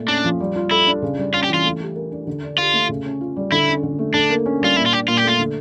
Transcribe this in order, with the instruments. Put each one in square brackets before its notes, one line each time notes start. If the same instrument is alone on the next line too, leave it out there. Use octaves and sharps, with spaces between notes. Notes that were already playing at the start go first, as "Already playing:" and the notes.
Already playing: [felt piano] A#2 A3
[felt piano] C#4 [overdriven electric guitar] D4
[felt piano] F3
G3
F4
[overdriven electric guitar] E4 [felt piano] A4
[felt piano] D4
C#3
G3
[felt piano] C#4 [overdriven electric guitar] F4
[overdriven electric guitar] G4
[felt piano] E3 [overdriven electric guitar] F4
[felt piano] A3
G4
A#4
D4
D3
D4
[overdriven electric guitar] F4 [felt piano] G4
[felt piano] A3
C#3
C#4
F4
G3
[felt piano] D3 [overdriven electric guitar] E4
[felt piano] C#4
D3
A3
[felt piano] D3 [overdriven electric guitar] D4
[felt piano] A#3
C#4
[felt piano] G3 [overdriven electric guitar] F4
[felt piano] A#2 [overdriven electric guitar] E4
[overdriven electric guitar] F4
[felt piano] D4 [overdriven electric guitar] G4
[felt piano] A#2 [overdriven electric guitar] F4
[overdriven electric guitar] G4
[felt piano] A3 [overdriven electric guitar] F4
[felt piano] D3